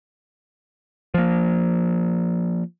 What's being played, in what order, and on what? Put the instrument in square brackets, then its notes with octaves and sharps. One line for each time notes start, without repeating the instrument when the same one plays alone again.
[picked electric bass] F3 A#3